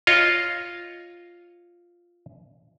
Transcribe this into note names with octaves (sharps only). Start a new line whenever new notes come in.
F4 C#5 D#5